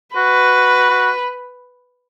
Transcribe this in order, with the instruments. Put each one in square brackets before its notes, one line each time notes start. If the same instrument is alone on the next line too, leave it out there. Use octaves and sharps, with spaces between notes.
[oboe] F#4 [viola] B4
[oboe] F#4